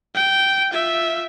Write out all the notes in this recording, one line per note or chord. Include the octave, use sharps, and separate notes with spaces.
G5
F4 E5